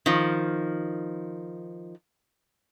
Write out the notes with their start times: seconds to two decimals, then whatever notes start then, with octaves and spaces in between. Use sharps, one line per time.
0.06 D#3 F3